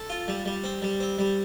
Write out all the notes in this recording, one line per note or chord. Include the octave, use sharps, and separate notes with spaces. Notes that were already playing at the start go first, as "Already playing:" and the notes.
Already playing: A4
F4
G3
G3
C4
G3
C4
G3